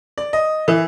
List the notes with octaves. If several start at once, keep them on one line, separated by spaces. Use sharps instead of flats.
D5
D#5
E3